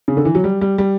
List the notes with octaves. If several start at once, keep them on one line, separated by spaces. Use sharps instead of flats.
C#3
D3
E3
F#3
G3
G3
G3